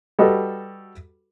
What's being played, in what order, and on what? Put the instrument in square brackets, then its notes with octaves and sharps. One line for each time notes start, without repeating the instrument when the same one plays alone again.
[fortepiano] G3 F#4 A4 B4 D#5